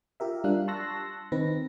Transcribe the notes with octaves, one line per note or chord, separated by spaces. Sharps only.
F4 G4 A#4 E5
G3 D4 F4 F5 F#6
A5 C6 C#6 E6 F#6 A#6
D#3 C4 D#4 B4 A#6